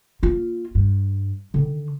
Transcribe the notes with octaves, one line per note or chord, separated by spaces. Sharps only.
A#3 F4
G2
D3 D#3